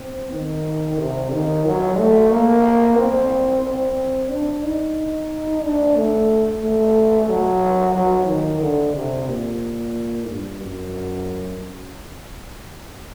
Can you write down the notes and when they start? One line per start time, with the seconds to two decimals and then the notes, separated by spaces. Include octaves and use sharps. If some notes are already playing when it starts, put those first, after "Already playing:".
Already playing: C4
0.32 D#3
0.98 C3
1.31 D#3
1.65 F#3
1.98 A3
2.31 A#3
2.97 C4
3.65 C4
4.30 D4
4.64 D#4
5.63 D4
5.96 A3
6.63 A3
7.29 F#3
7.95 F#3
8.28 D#3
8.61 D3
8.95 C3
9.28 A#2
10.27 G2
10.61 F#2